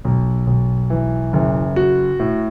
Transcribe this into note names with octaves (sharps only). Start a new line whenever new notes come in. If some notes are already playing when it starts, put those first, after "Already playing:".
B1
B1
E3
F#1
F#4
A2